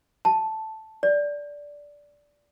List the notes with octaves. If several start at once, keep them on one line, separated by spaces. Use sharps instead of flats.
A5
D5